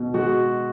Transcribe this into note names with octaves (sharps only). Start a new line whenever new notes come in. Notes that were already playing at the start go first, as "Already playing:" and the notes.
Already playing: B2
G#3 F#4